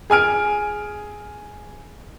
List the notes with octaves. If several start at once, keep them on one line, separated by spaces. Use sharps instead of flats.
G#4 G#5 F6 D7